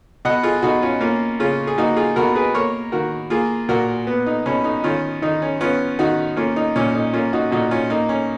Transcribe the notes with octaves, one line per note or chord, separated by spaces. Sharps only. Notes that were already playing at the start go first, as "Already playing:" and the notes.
B2 D#5 F#5
F4 G#4
B2 D#4 F#4
C#4 F4
A#3 C#4 F4
C#3 C#4 F4
G#4
A#3 D#4 F#4
F4 G#4
B2 F#4 A#4
G#4 B4
A#3 A#4 C#5
D#3 F#4 A#4
A#3 F4 G#4
A#2 F#4 A#4
B3
D#4
B2 C#4
D#4
D#3 C#4 F4
D#3 D#4
C#4
B3 C#4 F4
D#3 D#4 F#4
A#3 C#4 F4
D#4
A#2 C#4
D#4
A#3 C#4 F4
D#4 F#4
A#2 D#4 F#4
C#4 F4
A#3 D#4
C#4